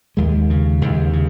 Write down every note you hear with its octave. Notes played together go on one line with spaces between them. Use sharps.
D#2 G#3
C#3
D#2
C#3